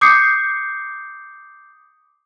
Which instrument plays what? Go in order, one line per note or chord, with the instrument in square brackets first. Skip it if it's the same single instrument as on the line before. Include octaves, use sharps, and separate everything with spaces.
[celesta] D6 D#6 G6 C7 C#7